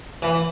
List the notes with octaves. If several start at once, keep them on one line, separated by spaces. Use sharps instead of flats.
E3